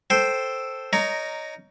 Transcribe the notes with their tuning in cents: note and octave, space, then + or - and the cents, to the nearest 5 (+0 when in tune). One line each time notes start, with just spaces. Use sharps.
A4 +0 C5 +0 G5 +0
D#4 +0 A#4 -5 C#5 +20